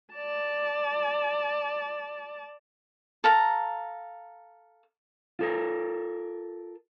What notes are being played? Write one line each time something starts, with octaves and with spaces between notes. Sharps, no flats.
D5 A5
A4 F5 A#5
F4 A4 A#4